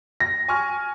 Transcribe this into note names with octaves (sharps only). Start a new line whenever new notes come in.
A#6
G#5 C#6 F6